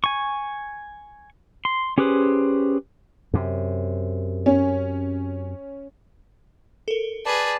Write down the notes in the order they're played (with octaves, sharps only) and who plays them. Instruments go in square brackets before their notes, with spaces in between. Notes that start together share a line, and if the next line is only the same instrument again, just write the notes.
[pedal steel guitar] G#5 C#6
C6
C#4 G4 G#4 B4 C5
[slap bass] F#2 C3
[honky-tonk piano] C#4
[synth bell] A4 A#4
[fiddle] G#4 B4 [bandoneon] D5 A5